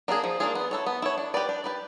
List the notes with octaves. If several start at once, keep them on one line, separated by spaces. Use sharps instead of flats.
A#3 D4 F4 G#4
F3
A#3 D4 F4 G#4
B3
E4 A4 C#5
B3
E4 A4 C#5
D4
G4 B4 D5
D4
G4 B4 D5